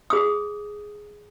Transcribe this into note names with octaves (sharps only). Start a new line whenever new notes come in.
G#4 D#6